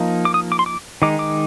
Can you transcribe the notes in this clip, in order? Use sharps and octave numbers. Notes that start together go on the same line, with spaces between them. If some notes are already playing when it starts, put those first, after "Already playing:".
Already playing: F3 A#3 D#4
D6
D#6
D6
C6
D6
D#3 G#3 D#4 D6
D6